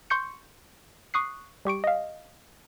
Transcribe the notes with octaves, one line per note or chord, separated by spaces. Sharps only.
C6 C#6 G6 C#7
C#6 D#6 F#6 C7
G3 G4 C#6 D7
D#5 F5